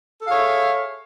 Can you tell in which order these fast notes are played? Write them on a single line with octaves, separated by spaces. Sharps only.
A4 G#4 F5 C#5 E5